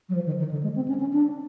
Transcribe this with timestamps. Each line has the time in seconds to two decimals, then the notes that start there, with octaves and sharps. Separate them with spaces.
0.09 F#3
0.15 F3
0.26 D#3
0.39 D#3
0.51 D3
0.63 G#3
0.76 C4
0.88 C#4
1.00 C#4
1.13 D4